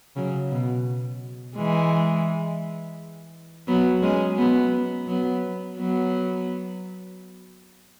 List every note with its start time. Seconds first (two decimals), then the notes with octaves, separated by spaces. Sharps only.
0.16 C#3 F#3
0.51 B2
1.57 E3 G#3
3.68 F#3 B3
4.02 G#3 C#4
4.37 F#3 B3
5.07 F#3 B3
5.77 F#3 B3